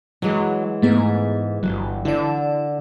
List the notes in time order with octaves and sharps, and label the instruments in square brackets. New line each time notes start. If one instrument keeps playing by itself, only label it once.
[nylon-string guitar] E3 G#3 [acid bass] F#3
[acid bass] G#2 [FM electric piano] A3 B3 G#4
[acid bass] G1 [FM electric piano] F#3
[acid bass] D3 [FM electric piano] E4 D5